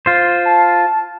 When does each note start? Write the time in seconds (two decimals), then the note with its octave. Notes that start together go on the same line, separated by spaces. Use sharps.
0.06 F4 C5
0.45 A5